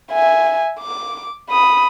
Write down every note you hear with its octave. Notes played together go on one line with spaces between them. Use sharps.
E5 G#5
D6
B5 D#6